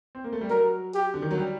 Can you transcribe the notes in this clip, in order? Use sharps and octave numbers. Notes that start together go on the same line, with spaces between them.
C4
A#3
A3
G3
F#3 A#4
G4
D3
D#3
F#3
G3